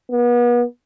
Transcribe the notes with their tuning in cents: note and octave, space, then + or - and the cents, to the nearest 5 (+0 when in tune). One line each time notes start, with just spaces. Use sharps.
B3 -35